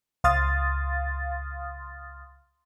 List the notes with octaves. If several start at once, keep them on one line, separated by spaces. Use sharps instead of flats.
C#2 F5 C6 D#6 F6 A6